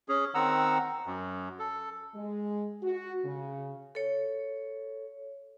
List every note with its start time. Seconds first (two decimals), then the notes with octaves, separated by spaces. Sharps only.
0.09 C#4 G#4
0.35 D#3 C4 F#5 A#5 E6
1.06 F#2
1.59 A4
2.15 G#3
2.83 F#4
3.25 C#3
3.95 A4 C#5